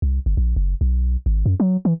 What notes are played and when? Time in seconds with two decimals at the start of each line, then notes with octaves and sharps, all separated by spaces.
0.02 C2
0.26 G1
0.37 A#1
0.56 F#1
0.81 B1
1.26 G#1
1.46 F#2
1.60 F#3
1.85 E3